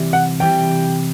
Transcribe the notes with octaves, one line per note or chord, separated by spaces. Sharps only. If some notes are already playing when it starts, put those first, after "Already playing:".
Already playing: C3 E3 G3 C4 E4
F#5
C3 E3 G3 C4 E4 G5